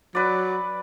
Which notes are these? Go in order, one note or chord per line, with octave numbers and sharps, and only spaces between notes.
F#3 B4 D5